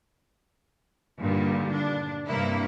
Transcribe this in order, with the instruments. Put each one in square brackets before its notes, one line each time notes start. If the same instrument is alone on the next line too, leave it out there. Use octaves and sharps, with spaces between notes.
[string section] G2 A#2 D3 D#3 G3
D4
G2 C3 A#3 E4